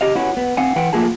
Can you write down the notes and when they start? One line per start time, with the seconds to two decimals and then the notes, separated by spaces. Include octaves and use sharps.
0.01 C#3 G4 D#5 F5
0.15 B3 C#4 E4 F#4
0.37 B3
0.57 C4 F5 F#5 G#5
0.76 E3 B4 F#5 G5
0.93 F3 A3 A#3 F4 G#4 A5